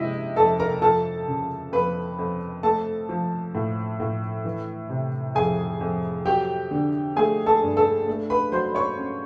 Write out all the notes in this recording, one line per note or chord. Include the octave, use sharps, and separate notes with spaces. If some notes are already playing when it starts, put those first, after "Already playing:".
Already playing: C3 G#3 E4 D#5 E5
F2 A4 A5
A#4 A#5
F3 A4 A5
C#3
F2 B4 B5
F2
A3 A4 A5
F3
A2
A2
E3
C3
F2 G#4 G#5
F2
F#3 G4 G5
D3
A3 G#4 G#5
A4 A5
G2
A4 A5
A3
B4 B5
F#3 C5 C6
C#5 C#6
C#4